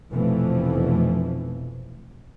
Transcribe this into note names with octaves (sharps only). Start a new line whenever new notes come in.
F1 B2 E3 F3 A3